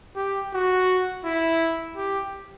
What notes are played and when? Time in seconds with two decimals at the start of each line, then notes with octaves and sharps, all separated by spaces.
0.16 G4
0.53 F#4
1.24 E4
1.96 G4